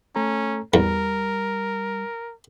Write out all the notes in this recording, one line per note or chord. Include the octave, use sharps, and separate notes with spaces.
A3 C#4 A4 A#5
E2 G3 A#4